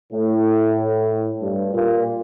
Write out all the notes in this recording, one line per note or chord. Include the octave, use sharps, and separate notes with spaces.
A2
G2
A#2